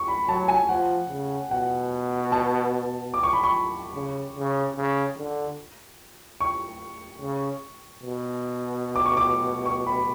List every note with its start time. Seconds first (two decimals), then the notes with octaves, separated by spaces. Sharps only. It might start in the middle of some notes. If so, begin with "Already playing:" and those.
Already playing: C#6
0.08 B5
0.28 F#3 A5
0.48 G#5
0.69 F3 F#5
1.10 C#3
1.51 B2 F#5
2.32 A5
3.14 D6
3.23 C#6
3.33 B5
3.43 C#6
3.95 C#3
4.36 C#3
4.76 C#3
5.18 D3
6.40 C#6
7.21 C#3
8.04 B2
8.96 D6
9.06 C#6
9.17 D6
9.66 C#6
9.87 B5